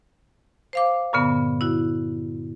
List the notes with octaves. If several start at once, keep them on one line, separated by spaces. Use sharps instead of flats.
C5 F5 D6
G2 A#2 D3 B3
E4 F#4